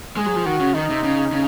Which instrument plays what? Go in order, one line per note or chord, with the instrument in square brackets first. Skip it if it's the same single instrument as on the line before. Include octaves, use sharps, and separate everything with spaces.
[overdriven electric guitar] G#3 [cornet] G#4
[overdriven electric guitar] F#3
F3
[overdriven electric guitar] D#3 [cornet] F#4
[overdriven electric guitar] C#3
[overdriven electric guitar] D#3 [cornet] D#4
[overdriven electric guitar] C3
C#3
C#3